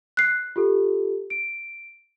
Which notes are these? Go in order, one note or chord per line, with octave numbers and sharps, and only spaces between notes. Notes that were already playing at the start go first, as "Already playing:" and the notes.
F#6 C7
F4 G4 A4
D7